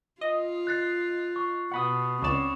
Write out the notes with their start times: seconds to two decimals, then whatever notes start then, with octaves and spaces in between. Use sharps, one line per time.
0.21 F4 D#5
0.67 F#6 A6 C7
1.36 C#6
1.72 B2 F#5 B5 D#6
2.22 C#2 C4 C#4 D5 C#6 E7